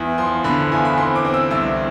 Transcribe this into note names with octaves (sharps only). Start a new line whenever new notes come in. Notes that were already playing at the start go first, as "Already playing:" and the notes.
Already playing: E2
F3 C6
D3 B5
F5
E2 G#5
B5
C4 C6
D6
C4
E6
C2 E6